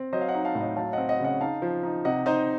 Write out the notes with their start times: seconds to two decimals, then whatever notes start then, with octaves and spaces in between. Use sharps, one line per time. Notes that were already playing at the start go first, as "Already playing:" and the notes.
Already playing: C4
0.13 F#3 C5 D#5
0.21 F5
0.28 D#5 F#5
0.34 D#4
0.45 F5 A5
0.55 A2
0.61 D#5 F#5
0.76 F#3 F5 A5
0.93 C4 D#5 F#5
1.09 D#5 F#5
1.20 C#3 D#5 F#5
1.41 D#4 F5 A5
1.62 F3
1.83 D#4
2.05 C3 D#5 F#5
2.26 D#4 C5 D#5